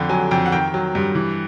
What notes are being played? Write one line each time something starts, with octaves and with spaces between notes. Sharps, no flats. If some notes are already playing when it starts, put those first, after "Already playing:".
Already playing: F2 D3 G5
F#3 G#5
F2 G5
F#5
D#3 G5
F#3
G2
E3